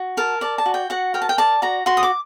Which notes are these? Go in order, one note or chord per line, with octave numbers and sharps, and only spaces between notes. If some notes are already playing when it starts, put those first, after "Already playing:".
Already playing: F#4
A#4 A5
D5 A5
A5
F#4
G5
F#4 F#5
A#4 G5
A5
G5
D5 A5
F#4 A#5
F#4 C6
D#6
D6